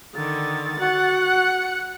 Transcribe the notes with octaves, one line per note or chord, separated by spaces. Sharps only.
D3 D#3 A6
F#4 F#5
F#6